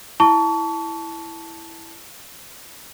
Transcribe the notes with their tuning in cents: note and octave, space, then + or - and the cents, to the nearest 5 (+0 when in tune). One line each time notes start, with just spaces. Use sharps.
E4 +0 A5 +0 C#6 +35